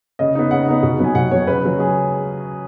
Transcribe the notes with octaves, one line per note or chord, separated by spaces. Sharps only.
C#3 D#5
B3 D#4
C#3 F#5
B3 D#4
B2
F#3 B3 G#5
B2 F#5
F#3 B3 C#5
C#3 B4
F#3 C#4
C#3 G#4